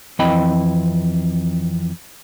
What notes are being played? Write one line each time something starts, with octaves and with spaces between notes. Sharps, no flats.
F2 E3 C4 D#5 G5 B5